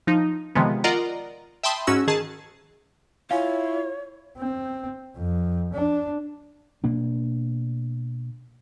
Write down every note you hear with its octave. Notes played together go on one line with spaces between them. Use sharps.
F3 D#4
C3 D#3 F3 G#3 B3
F4 A#4 D5 D#5 F#5 A#5
E5 G5 A5 B5 C6 D#6
G#2 C#4 F#4 E6
D#3 G#4 A5
E4 F4 C#5 F5 G#5
C4
F2
D4
B2 A#3 D4